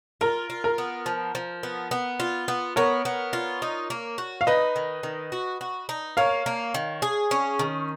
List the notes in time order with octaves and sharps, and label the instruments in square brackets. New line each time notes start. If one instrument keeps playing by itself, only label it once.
[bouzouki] F4 [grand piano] A#4
[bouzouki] F4
[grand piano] A#4
[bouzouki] B3
F3
F3
B3
B3
F4
B3
[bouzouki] B3 [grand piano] A#4 C#5
[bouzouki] B3
F4
D#4
A#3
F#4
[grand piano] F5
[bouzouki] D#4 [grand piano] B4 D#5
[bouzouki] D#3
D#3
F#4
F#4
D#4
[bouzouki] A#3 [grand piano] C#5 F5
[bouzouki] A#3
D#3
G#4
C#4
D#3